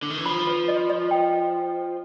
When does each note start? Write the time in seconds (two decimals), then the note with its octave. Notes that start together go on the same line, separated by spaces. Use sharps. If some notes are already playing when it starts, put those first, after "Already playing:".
0.03 D3
0.10 D#3
0.18 E3
0.26 F3 B5
0.47 B4
0.68 D#5
0.90 D#5
1.11 G5